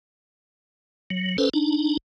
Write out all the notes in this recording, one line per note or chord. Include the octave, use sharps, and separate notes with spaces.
F#3
C#4 A4 B4 C5
D4 D#4